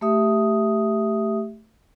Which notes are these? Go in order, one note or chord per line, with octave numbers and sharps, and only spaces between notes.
A3 G4 E5 D#6